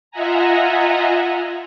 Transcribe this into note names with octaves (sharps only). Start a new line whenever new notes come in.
F4 D#5 E5 F#5 G#5 A#5